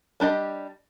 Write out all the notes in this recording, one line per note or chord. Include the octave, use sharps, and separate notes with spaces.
G3 D4 G4 D#5